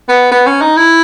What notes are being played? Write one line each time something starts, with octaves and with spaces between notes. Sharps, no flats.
B3
B3
C#4
D#4
E4